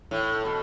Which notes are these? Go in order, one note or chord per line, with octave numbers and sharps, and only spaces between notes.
A2
B2